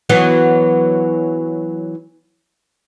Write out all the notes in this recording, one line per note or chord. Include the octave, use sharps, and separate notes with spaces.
E3 F#3 B3